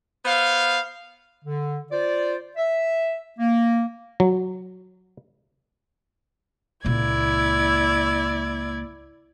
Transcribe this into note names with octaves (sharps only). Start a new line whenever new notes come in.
B3 C5 F5
D3
F4 C5 D5
E5
A#3
F#3
C#2 A#2 E4 D5 G#6